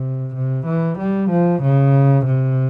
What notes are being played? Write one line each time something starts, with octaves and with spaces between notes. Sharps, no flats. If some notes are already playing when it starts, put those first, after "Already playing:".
Already playing: C3
C3
E3
G3
F3
C#3
C3